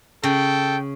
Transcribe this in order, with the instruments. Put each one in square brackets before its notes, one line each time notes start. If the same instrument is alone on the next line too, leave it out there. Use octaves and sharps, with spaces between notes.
[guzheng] C#3 [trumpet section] A4 G5